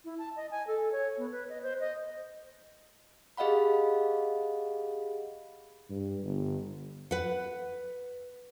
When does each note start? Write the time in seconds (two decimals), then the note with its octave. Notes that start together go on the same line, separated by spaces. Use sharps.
0.05 E4
0.18 A5
0.36 D#5
0.51 G#5
0.67 A4
0.92 C#5
1.18 B3
1.32 B4
1.49 D#5
1.63 C5
1.80 D#5
3.37 G4 G#4 D#5 F5 F#5 B5
5.90 G2
6.23 G1
7.11 B4 F#5